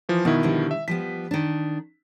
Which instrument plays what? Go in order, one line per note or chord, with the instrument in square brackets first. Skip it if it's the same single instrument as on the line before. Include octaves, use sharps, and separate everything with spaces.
[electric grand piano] E3 F3
[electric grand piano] B2 D#3 E4 [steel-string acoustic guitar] B3
[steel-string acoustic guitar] D3 F3 G3
[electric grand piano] E5
[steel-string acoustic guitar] F3 G3 B3 [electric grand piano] B6
[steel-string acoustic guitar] D#3 D4